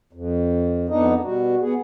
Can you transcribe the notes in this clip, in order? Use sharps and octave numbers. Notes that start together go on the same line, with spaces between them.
F2
F2 B3 D4 D#4 D#5
B2 G3 F#4
B3 G#4